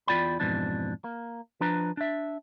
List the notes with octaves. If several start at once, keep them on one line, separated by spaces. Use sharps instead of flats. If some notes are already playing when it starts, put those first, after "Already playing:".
E2 F#3 F4 D5 G5 B5
F2 G#2 B2 E3 D4
A#3
F3 D4 B4 A#5
D4 E5